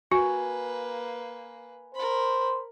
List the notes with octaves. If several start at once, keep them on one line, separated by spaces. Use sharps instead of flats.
A#3 F#4 B4 G#5
A#4 C5 B5